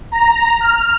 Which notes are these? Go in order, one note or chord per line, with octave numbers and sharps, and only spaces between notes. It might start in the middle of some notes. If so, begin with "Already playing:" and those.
A#5
F6